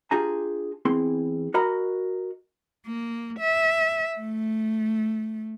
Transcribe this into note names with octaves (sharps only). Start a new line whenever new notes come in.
D4 F4 G4 G#4 G#5 A#5
E2 C4 E4 G#4 C6
F#4 A#4 D#5 A#5 B5
A#3
E5
A3